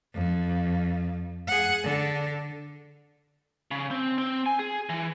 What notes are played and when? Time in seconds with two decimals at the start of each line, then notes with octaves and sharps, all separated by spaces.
0.14 F2
1.47 G#4 F#5
1.83 D3
3.71 C#3
3.91 C4
4.18 C4
4.46 G#5
4.59 G#4
4.89 E3